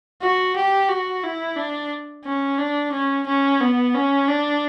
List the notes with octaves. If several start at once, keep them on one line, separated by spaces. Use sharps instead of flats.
F#4
G4
F#4
E4
D4
C#4
D4
C#4
C#4
B3
C#4
D4